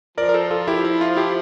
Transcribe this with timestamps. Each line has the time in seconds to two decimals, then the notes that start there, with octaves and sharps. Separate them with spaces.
0.18 F3 A#4 D5
0.29 A#4
0.34 A4 C5
0.51 F4 A4
0.68 E4 G4
0.85 E4
1.01 F4
1.17 E4 G4